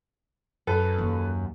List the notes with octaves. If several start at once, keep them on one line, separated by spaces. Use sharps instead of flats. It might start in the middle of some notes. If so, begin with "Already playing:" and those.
F#2 A4 B4
D#2 F#3